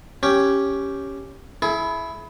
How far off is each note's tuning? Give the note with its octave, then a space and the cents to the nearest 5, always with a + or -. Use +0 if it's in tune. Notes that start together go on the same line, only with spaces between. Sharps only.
C#4 +0 G4 +0
E4 +0 G#4 +40